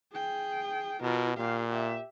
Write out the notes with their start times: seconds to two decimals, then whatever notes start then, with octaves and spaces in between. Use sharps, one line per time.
0.13 G#4 G5
1.02 B2 F4 A#4
1.37 A#2 G4 F5
1.69 G4 E5